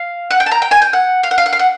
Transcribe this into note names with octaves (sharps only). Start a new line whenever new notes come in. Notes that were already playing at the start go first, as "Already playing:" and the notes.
Already playing: F5
F#5
G5
A5
A#5
G5
G#5
G5
F#5
F5
F#5
F5
F#5
F5
F#5